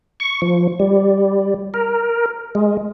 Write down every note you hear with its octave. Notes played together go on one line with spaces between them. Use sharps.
C#6
F3
G3
A#4
G#3